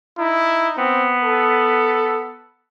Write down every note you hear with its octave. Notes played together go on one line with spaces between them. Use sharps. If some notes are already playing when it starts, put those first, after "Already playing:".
D#4 E4
B3 C4
A4